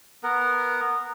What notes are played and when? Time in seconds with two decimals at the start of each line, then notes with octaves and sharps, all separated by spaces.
0.23 B3 A#4 F#5